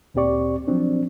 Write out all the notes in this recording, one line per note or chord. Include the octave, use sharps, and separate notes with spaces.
D2 A#2 C4 G4 D5 C#6
F3 F#3 C4 D4